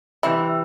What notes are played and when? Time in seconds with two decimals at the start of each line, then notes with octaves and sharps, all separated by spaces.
0.23 C3 E3 G3 E4